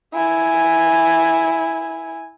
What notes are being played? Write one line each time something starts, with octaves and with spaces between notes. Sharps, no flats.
E4 G#5